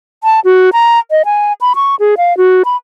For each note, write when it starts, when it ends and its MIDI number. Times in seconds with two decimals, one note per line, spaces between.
0.24 0.40 81
0.45 0.70 66
0.73 0.99 82
1.11 1.23 75
1.25 1.53 80
1.61 1.73 83
1.75 1.95 85
2.00 2.15 68
2.17 2.36 77
2.37 2.63 66
2.65 2.76 83